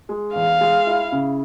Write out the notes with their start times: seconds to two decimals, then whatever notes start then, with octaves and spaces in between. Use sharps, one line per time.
0.09 G#3
0.35 E2 F5
0.61 G#3
0.87 E4
1.12 C#3